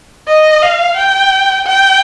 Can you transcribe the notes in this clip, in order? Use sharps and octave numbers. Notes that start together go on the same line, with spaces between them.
D#5
F5
G5
G5